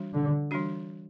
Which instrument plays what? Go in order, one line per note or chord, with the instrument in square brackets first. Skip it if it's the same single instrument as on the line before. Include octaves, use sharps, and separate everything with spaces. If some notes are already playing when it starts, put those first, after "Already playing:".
Already playing: [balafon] E3 G3 D4 F#4
[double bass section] D3
[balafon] E3 G3 D4 F#4